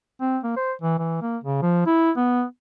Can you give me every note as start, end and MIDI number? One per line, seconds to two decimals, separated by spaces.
0.21 0.38 60
0.43 0.54 58
0.57 0.72 72
0.82 0.96 52
0.99 1.22 52
1.22 1.37 58
1.44 1.61 49
1.62 1.82 53
1.87 2.11 64
2.17 2.43 59